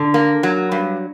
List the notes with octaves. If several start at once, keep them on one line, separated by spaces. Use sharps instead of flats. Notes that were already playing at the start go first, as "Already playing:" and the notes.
Already playing: D3
A#3
F#3
G2